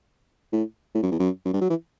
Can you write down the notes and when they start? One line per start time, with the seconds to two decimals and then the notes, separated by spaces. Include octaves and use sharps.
0.53 A2
0.95 A2
1.03 F#2
1.11 E2
1.19 F#2
1.45 F#2
1.54 G2
1.61 F#3
1.70 E3